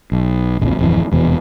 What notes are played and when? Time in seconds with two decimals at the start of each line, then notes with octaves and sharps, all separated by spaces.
0.12 B1
0.59 D1 A#1 F2
0.79 D1 F2 E3
1.12 F1 E2 B2